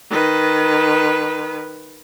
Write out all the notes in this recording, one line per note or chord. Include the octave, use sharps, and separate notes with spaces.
D#3 B4